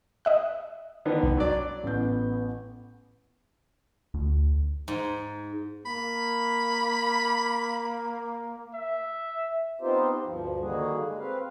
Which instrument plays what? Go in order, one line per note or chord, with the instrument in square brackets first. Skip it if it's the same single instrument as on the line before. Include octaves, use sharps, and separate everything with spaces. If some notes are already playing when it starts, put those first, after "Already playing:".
[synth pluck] D#5 E5 F#6
[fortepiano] D3 D#3 B3
[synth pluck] C2
[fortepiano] F#3 D4 D5
[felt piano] A1 G6 [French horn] B3
[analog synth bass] D2
[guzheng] G#2
[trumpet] A#3 [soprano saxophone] B5
[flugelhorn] E5
[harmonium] B3 C4 D#4 F4 G4 C5
D2 G2 F3
D3 D#3 G3 A#3 F#4 G#4
G#3
C4 B4 F5